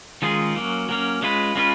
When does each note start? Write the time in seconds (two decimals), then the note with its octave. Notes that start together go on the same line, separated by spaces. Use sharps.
0.22 D#3 G#3 C#4 F4 G#4
0.55 F#3 A#3 C#4
0.89 F#3 A#3 C#4
1.22 G#3 C#4 F4 B4
1.56 G#3 C#4 F4 B4